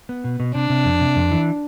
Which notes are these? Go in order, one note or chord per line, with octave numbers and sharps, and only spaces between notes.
B3
B2
B2
C3 D4
C3
F2
C3
F2
E3